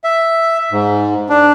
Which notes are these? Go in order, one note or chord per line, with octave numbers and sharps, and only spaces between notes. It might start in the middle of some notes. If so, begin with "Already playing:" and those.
E5
G#2
D4